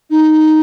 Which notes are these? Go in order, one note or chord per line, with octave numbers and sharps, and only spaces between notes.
D#4